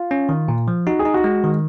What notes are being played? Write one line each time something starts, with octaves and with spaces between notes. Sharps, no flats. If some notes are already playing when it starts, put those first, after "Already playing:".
Already playing: F4
C#4
D#3
A#2
F3
D#4 F#4
G#4
D#4
F#4
G#3
D#3